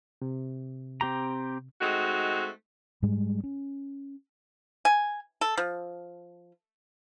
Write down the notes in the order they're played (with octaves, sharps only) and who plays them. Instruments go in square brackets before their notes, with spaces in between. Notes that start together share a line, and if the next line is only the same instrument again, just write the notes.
[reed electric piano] C3
[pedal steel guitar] C4 G4 A#5
[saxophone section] G#3 A3 C4 D#4 F#4
[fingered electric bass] G#2 G3 G#3
C#4
[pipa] G#5
A4
F3